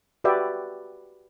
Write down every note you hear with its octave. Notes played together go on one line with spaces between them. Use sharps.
F#4 G4 B4 D5 E5 G5